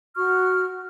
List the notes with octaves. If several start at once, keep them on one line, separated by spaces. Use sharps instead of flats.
F#4 C#6 F6